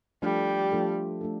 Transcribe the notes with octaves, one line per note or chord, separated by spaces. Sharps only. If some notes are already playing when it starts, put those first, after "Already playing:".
F3 G3 A3 D4 F4 A4
F3 A3 D4 F4 A4
A3 D4 F4 A4